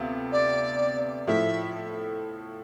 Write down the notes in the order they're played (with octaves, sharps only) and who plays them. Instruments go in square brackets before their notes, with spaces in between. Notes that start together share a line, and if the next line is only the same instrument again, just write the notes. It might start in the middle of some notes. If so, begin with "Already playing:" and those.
Already playing: [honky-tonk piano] D2 C3 B3 F4
[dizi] D5
[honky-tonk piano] A2 F3 A3 E4 [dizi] E5